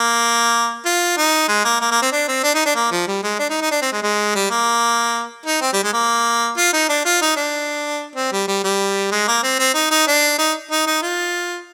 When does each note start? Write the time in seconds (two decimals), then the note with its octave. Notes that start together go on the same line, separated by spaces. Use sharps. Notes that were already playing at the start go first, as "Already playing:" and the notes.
Already playing: A#3
0.86 F4
1.18 D#4
1.48 G#3
1.65 A#3
1.81 A#3
1.91 A#3
2.02 C4
2.13 D4
2.28 C4
2.44 D4
2.55 D#4
2.66 D4
2.76 A#3
2.92 F3
3.08 G3
3.24 G#3
3.39 D4
3.50 D#4
3.61 D#4
3.71 D4
3.82 C4
3.93 G#3
4.03 G#3
4.35 G3
4.51 A#3
5.46 D#4
5.62 C4
5.73 G3
5.83 G#3
5.94 A#3
6.57 F4
6.74 D#4
6.89 D4
7.05 F4
7.22 D#4
7.37 D4
8.16 C4
8.33 G3
8.48 G3
8.64 G3
9.12 G#3
9.28 A#3
9.43 C4
9.59 C4
9.75 D#4
9.91 D#4
10.08 D4
10.39 D#4
10.71 D#4
10.87 D#4
11.03 F4